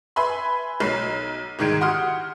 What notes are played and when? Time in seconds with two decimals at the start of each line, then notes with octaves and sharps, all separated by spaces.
0.16 B4 E5 G#5 B5 C6
0.80 B1 F#3 C7
1.59 C2 G#2 D#3 G#3 G#6 D7
1.81 F#4 G4 F#5 C6 D#6 F6